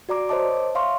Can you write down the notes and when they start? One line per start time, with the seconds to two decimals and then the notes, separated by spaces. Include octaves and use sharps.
0.09 F#4 D5 A#5 D6
0.29 A#4 C5 C#5 D#5 A5 D6
0.75 C#5 E5 F5 C6 C#6